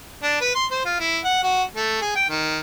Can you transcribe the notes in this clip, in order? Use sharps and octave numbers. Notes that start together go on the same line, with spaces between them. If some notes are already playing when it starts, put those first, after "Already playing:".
D4
B4
C6
C5
F4
E4
F#5
F#4
A3
G#4
G5
D#3